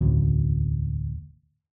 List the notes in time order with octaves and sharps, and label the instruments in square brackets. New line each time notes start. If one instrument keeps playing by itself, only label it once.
[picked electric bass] E1 A1 D2